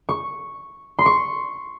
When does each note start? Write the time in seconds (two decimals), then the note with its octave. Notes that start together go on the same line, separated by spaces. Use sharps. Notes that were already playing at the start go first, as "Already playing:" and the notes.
0.09 C#6
0.99 C6
1.06 C#6